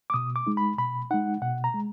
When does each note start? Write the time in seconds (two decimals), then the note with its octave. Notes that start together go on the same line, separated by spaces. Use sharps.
0.10 D6
0.14 B2 D#6
0.36 D6
0.47 G#3 D#4
0.57 B5
0.78 B2 B5
1.11 G#3 D#4 F#5
1.42 B2 F#5
1.64 A#5
1.74 G#3